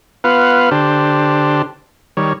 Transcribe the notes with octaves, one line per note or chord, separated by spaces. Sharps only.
B3 F4 B4 F5 F#5
D3 D4 G4 C5
D#3 G3 C#5